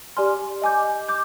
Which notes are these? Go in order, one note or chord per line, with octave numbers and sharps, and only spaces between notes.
G4 D5 G#5 C6 F6
D#5 G#5 D6 G6
D6 G6